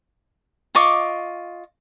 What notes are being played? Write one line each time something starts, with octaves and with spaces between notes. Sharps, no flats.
F4 D#5 C#6 D6